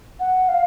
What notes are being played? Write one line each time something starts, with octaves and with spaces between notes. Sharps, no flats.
F#5
F5